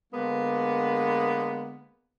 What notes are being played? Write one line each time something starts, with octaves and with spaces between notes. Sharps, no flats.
D3 G#3 A#3 B3